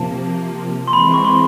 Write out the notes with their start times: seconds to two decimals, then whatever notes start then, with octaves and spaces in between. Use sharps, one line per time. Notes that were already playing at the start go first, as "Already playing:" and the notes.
Already playing: C3 F3 A#3 A5
0.88 C6
0.93 E3 G#3 C4 B5
1.14 C#6
1.25 C6